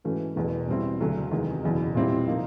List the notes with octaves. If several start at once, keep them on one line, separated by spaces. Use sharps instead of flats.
G#2 E3 A3 C#4 F#4
E1 E2 B2 G#3
B2 G3 C4 E4
D2 C#3 F#3 A3 C#4
E2 C3 D#3 G#3
F#1 E2 B2
A#2 G3 C4 E4 G4
C3 F3 A#3 D#4